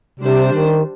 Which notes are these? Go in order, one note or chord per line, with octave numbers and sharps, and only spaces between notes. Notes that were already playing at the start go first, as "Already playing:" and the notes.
C3 G3 D4 G4 C5
D#3